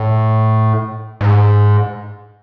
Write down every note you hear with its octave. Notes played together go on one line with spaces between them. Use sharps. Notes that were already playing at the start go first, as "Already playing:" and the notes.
Already playing: A2
G#2